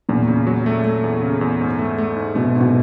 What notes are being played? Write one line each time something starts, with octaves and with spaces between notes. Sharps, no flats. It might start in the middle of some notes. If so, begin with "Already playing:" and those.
E2 A#2
C#3
F#3
A3
A3
E2
C#3
E2
G#2
A3
A3
G#2
B2 A3
G#2
B2